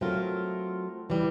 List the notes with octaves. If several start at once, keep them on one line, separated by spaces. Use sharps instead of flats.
F#3 A3 C4 F4 A#4
E3 G3